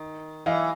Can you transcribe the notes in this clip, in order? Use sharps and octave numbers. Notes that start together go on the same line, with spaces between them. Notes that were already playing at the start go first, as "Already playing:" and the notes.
Already playing: D#3
E3 D#5 F5